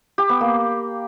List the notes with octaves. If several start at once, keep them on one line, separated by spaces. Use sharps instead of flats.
G4
B3
A#3